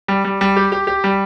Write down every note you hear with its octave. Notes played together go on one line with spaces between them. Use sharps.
G3
G3
G3
G4
G4
G4
G3